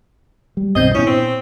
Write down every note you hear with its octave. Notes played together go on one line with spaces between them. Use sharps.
G3
B1 G2 B2 D#3 C4 D#5 G6
A#2 B3 C#4 D4 E4
C4